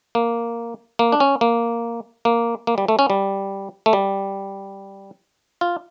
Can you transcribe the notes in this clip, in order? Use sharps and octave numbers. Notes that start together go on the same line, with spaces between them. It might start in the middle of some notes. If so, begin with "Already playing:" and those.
A#3
A#3
D4
C#4
A#3
A#3
A#3
G3
A3
C#4
G3
A3
G3
F4